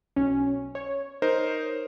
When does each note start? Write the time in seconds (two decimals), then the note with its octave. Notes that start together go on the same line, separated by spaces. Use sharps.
0.16 B1 C#4
0.75 C#5
1.22 D#4 A#4 C5